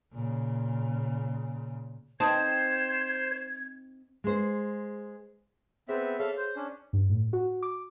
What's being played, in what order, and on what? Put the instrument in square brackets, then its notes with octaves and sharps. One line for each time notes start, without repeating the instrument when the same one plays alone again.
[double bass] A#2 C#3
[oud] C4 [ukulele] D#4 B4 A5 [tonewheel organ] C5 [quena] G#6
[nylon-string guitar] G#3 C5
[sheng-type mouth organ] B3 C4 E5 [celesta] G#4 C5
[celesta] G#4 C#5 [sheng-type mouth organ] A4 E5 F5
[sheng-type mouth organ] C5
C#4 D4
[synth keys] G2
A2
F#4
D6